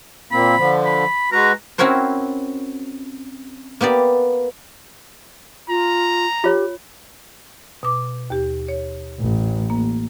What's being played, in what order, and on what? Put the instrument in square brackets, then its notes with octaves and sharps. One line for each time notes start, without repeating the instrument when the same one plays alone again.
[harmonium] A#2 A#3 C4 [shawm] B5
[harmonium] D3 F3
[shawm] B5
[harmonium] G#3 F#4 B4 [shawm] A#5
[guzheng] C4 C#4 E4 F#4 A#4 C5
A#3 B3 G4 D5
[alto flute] F4 [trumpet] A#5
[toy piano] F4 C#5 [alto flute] G4
[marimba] B2 D6
D#2 G4
C#5
[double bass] A1
[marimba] A#3